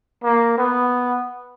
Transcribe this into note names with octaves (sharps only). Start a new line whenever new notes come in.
A#3
B3